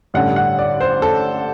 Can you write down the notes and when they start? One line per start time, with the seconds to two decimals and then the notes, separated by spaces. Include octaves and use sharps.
0.14 A1 G2 D3 F#5
0.36 F#5
0.59 D5
0.81 C5
1.02 A4